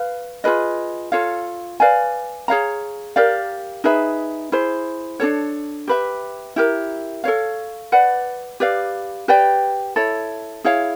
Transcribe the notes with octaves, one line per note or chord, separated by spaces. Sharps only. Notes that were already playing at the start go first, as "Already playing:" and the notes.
Already playing: B4 F5
F4 G#4 B4 D#5
F4 A4 C#5 F5
B4 D5 F5 G#5
G#4 C#5 F5 A#5
G4 A#4 D5 F5
D#4 G#4 B4 E5
E4 G#4 C5
D4 F4 A4 C#5
G4 B4 E5
E4 G4 A#4
A4 C#5 F5
B4 D5 F#5
G4 B4 D5 F5
G4 B4 D5 G5
E4 A4 C#5
E4 G#4 C#5 F5